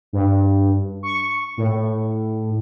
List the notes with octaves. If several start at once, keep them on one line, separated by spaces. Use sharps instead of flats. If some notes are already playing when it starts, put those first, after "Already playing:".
G2
C#6
A2